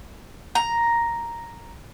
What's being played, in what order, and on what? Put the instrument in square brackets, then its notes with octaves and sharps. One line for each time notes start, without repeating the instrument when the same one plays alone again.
[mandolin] A#5